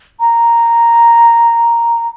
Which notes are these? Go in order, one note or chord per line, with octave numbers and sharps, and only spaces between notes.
A#5